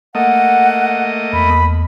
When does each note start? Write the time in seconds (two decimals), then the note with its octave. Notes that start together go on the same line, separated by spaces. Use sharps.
0.15 A3 A#3 D#5 F#5
1.33 E2 B5